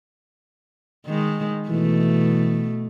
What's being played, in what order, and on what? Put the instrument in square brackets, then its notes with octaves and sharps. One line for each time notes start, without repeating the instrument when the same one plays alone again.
[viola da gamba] D#3 G#3
[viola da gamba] B2 A3 [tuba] E3